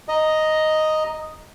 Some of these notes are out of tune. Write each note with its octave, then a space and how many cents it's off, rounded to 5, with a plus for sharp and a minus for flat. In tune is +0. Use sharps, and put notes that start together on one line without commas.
D#5 +0 A#5 +0